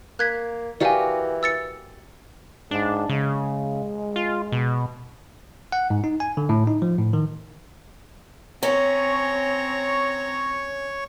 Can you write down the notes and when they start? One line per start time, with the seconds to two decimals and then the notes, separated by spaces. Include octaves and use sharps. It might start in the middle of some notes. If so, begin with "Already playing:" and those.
0.19 A#3 F#6 G#6 B6
0.80 E3 F#4 G4 A#4 D5 F5 G#5
1.43 E6 A6 C#7
2.71 G#2 D4
3.09 C#3 G#3
4.16 F4
4.52 B2
5.72 F#5
5.90 G#2
6.04 D#4
6.20 G#5
6.37 D3
6.49 A2
6.67 D#4
6.82 F3
6.99 A2
7.13 D#3
8.63 C4 C#4 C#5 A#5 C#6